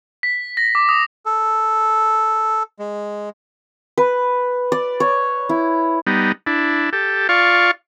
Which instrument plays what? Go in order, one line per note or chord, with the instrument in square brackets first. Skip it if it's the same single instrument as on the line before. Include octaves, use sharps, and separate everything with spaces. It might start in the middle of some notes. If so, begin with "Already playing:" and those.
[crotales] B6
A#6
D6
D#6
[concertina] A4
G#3
[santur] B4
D5
C#5
E4
[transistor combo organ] G3 B3 D#4
D4 E4
G4 A4
F4 D5 F5 C#6